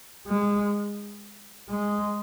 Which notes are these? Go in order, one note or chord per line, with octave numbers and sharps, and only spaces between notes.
G#3
G#3